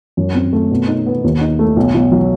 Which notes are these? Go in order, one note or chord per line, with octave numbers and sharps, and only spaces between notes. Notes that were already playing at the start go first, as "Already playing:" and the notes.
F#2
C4
A3
B2
D#4
B3
D#2
D#4
A3
B1
B1
F#3